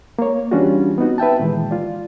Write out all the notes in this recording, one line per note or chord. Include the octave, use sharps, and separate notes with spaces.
A#3 C#5
E3 G3 C#4 D4 F4 F#4
B3 C4 D#4 F#4
B4 E5 G5 A5
A#2 D#3 E3 G#3
F4 D5